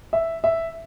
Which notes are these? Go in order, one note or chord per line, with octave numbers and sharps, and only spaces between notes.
E5
E5